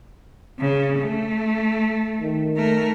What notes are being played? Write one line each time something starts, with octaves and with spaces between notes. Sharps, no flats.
C#3
A3
D#3
A3 A#4